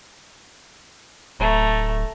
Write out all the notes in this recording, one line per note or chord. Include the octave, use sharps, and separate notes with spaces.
D1 A3 A#5